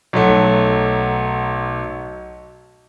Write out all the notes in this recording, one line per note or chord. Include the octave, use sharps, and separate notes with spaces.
B1 F#3 A3